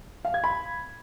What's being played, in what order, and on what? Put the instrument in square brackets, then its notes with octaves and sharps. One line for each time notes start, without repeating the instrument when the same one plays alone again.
[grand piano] F5
G#6
B5